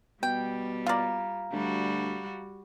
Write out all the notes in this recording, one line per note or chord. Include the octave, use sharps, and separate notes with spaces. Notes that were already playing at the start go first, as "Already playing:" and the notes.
B2 G3 G5
F4 D5 F5 A#5
D2 G3 F#4